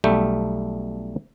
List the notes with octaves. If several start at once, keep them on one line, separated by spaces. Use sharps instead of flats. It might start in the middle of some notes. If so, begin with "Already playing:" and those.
B1 G3 A3 G5